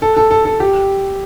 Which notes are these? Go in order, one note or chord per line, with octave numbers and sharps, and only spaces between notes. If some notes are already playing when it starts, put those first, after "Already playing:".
A4
A4
A4
A4
G4